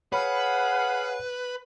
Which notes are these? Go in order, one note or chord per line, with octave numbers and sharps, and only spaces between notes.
G#4 B4 C#5 F5 F#5 B5